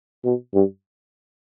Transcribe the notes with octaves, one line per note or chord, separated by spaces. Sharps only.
B2
G2